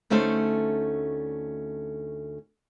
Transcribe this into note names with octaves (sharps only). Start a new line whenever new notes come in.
D2 A3 C#4 D#4 A4 C5